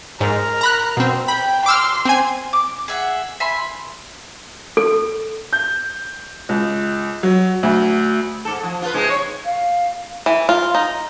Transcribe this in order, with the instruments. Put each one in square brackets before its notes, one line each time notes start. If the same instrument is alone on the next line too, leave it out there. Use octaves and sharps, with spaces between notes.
[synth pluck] G#2 [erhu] A#4
[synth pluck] A#5 B5 F#6
B2 C4
[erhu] G5 [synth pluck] B5
[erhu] C6 [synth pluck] D6 E6 F6
[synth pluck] C4 G#5
[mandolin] D6
G#4 E5 F#5
E5 G#5 B5 C6
[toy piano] A4
[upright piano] G6
C#2
F#3
D2
[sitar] G#2 A4
F3
F4 B4
C3 G#3 D#4
C#5
[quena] F5
[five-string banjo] E3
F4
D#4